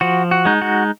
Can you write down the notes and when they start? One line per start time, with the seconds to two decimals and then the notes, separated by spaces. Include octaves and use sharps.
0.01 F3 F#4
0.31 F#4
0.45 G#3 D#4
0.62 F#4